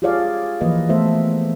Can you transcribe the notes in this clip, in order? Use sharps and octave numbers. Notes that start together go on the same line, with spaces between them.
F4 G4 G#4 C#5 D5 F5
E3 F3 A#3 B4 D#5
A3 B3 A4 C5 E5